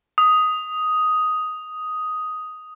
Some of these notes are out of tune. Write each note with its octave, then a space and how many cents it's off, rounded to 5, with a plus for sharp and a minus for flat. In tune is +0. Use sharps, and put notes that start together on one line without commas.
D#6 +5